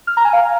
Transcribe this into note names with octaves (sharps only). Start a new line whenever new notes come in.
F6
A#5
G#5
F5